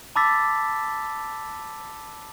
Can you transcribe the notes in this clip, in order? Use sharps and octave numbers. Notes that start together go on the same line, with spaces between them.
A5 B5 D6 E6 A6 B6